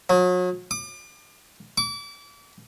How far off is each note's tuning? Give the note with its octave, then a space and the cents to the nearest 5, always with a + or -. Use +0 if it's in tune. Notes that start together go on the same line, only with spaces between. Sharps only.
F#3 -35
D6 +35
D6 -35